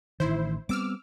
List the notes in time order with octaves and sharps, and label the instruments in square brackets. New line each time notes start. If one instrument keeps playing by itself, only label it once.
[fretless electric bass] A1 D#3 [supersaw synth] E4 C5
[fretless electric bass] G3 B3 C4 [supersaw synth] D6 E6 F6